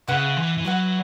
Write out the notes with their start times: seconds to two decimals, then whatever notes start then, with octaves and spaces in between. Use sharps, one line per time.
0.08 C#3 E4 B4 F#5
0.37 E3
0.57 E3
0.65 F#3 E4 B4 F#5